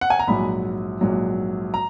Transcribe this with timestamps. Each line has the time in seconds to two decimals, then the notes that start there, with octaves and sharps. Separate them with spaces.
0.01 F#5
0.10 G#5
0.19 A#5
0.28 A#1 G#2 F#3 B5
1.01 A#1 G#2 F#3
1.74 A#5